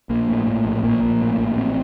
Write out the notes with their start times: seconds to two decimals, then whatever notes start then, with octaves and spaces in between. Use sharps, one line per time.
0.09 A#1 A#3
0.28 A2
0.47 A2
0.65 A#1
0.84 A#1 A#3
1.02 A#1
1.20 A2
1.39 A#1
1.56 A1 C4